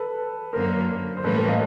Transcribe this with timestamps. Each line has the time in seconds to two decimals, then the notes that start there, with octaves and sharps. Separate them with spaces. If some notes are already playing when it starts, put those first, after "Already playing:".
Already playing: A4 B4
0.53 F#2 D3 F#3 A#3 A#4 C5
1.17 C5
1.24 A2 E3 G3 A#3 C#4 A4 B4
1.36 A#4 C5
1.47 D#5 F5